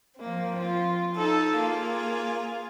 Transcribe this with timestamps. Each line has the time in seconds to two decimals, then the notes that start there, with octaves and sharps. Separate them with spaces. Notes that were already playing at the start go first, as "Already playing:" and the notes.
0.21 F3 A#3 C4
0.57 F4
1.17 D#4 A4
1.57 A#3 F4 G#4